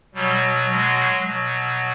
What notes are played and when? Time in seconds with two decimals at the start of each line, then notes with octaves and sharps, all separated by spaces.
0.14 B2 F#3 G3
0.70 F#3 G#3
1.26 B2 F#3